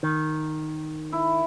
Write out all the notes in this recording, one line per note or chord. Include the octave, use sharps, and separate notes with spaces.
D#3
E4